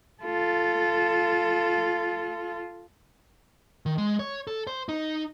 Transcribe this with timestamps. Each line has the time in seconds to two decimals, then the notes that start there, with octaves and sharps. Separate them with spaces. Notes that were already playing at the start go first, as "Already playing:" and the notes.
0.23 F4 A4
3.86 D#3
3.98 G#3
4.19 C#5
4.47 A4
4.67 C5
4.89 D#4